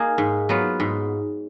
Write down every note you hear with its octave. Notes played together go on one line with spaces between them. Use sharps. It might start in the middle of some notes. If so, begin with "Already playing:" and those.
Already playing: A#3 D#4 G#4
G#2
F#3 B3 F4
G#2